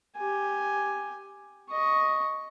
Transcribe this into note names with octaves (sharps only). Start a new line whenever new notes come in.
G4 G#5
D#5 C#6